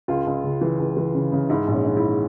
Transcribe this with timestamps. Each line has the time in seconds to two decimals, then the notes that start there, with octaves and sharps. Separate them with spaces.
0.08 C#2 F4
0.26 C#2
0.44 C#3
0.61 E3
0.79 C#2
0.97 E3
1.14 C#3
1.32 C#3
1.50 G#2 E4
1.68 A#1
1.74 C#4
1.85 G#2
1.97 E4